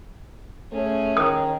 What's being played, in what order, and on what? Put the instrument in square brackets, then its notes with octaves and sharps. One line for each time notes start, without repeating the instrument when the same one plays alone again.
[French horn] A3 [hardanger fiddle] C#4 G#4
[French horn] D#3 [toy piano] D#6